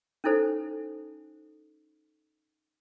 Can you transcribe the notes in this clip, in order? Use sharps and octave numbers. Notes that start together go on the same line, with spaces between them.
C#4 D#4 E4 A4 C5